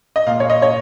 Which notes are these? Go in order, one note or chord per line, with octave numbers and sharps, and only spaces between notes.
D#5
A#2 F5
C#5
D#5
C#5